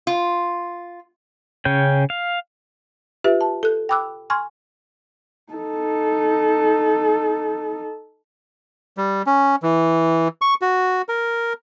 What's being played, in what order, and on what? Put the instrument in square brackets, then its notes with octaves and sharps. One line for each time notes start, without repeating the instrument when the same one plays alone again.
[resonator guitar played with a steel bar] F4
[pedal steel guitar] C#3 C#4 G5
F5
[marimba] F4 G4 B4 E5
A5
A4 F#6
G5 B5 D6 E6 F#6
G#5 C6 C#6 F6 G#6
[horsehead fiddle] D#4 A4
[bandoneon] G3
C#4
E3
C#6
F#4
A#4